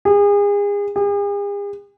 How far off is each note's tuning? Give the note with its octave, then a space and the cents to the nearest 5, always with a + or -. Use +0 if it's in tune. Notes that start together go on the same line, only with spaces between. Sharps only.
G#4 -35
G#4 -45